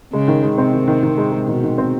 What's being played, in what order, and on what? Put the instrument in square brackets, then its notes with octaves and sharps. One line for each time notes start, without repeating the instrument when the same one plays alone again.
[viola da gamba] C#3 [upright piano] G#3
[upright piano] D#3
G#3
[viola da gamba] C3 [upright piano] C4
[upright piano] D#3
D#3
D#3
G#3
G#3
[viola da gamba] B2 [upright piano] D#3
[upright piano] D#3
C4